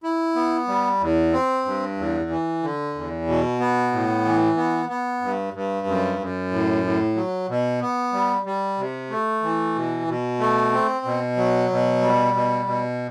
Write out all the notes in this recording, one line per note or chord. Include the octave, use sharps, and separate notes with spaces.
E4
B3
G3
E2
C4
G2
E2
E3
D3
E2
B2
B3
A2
E3
B3
B3
G2
G2
F#2
F#2
A2
A2
F#3
B2
B3
G3
G3
C3
A3
E3
B2
B2
A3
C4
B2
F#3
B2
G3
B2
B2